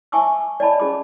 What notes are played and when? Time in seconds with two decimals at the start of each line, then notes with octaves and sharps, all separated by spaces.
0.12 E5 G#5 A5 C#6 D6 E6
0.60 D5 D#5 A5 B5
0.79 C#4 G#4 B5 D6